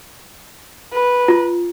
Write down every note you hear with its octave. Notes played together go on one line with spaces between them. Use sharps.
B4
F4